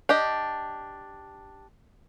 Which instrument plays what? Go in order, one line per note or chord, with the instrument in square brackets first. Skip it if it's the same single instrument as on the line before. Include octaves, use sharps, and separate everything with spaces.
[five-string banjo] D4 G4 D#5